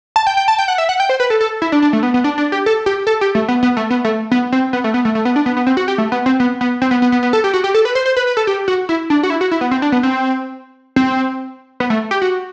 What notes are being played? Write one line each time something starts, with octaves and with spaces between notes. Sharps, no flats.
A5
G5
G5
A5
G5
F#5
E5
F#5
G5
C5
B4
A4
A4
E4
D4
D4
A3
B3
B3
D4
D4
G4
A4
G4
A4
G4
A3
B3
B3
A3
B3
A3
B3
C4
B3
A3
B3
A3
A3
B3
D4
B3
B3
C4
F#4
G4
A3
B3
C4
B3
B3
C4
B3
B3
B3
B3
A4
G4
F#4
G4
A4
B4
C5
C5
B4
B4
A4
G4
F#4
E4
D4
F#4
E4
F#4
E4
B3
C4
D4
B3
C4
C4
B3
A3
G4
F#4